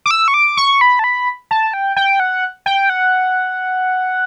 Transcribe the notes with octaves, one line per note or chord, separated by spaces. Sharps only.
D6
E6
C#6
D6
C#6
B5
A5
B5
A5
G5
G5
F#5
G5
F#5